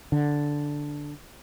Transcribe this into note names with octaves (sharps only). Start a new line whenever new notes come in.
D3